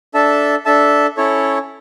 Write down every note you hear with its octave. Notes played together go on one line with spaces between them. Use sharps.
D4 A4 E5 A5
D4 A4 E5 A5
C#4 E4 A4 C#5